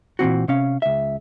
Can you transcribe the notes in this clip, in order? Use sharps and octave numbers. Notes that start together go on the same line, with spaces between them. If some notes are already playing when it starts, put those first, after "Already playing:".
A#2 E3 C4 F#4
C3 C#4 F5
C#2 E5